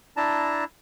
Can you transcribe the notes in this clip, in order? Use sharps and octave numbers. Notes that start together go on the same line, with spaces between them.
D4 E4 A5 A#5